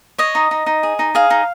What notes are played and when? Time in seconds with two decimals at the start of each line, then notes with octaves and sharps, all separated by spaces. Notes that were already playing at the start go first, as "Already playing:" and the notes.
0.18 C#5 D#5
0.35 D#4
0.51 D#4
0.66 D#4
0.83 G#4
0.99 D#4
1.15 G#4 F5
1.30 D#4